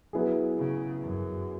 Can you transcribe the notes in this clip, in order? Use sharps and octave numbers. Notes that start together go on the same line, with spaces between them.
F#3 B3 E4 G#4
C#3
F#2